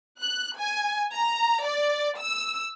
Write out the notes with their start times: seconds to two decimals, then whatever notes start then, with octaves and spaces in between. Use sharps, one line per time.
0.22 F#6
0.58 G#5
1.15 A#5
1.67 D5
2.20 E6